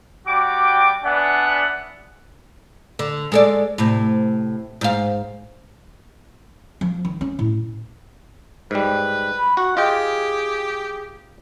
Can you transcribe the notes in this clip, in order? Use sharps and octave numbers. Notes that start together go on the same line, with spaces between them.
G3 F#4 G5 D6
B3 D4 D5 E5 F#5 G#5
D3
G#3 A4 D5
A2 C3
G#2 F5
F3
D#3
C#4
A2
G#2 G3 B4
B5
F#4 F#5 C#6
F4 G4 G#4 D#5 G5